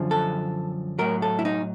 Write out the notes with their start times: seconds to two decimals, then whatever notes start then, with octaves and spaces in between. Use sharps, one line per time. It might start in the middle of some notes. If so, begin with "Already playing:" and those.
Already playing: F#2 D3 F3
0.11 A4
0.99 A2 F#3 A#4
1.22 A4
1.39 E4
1.45 D#4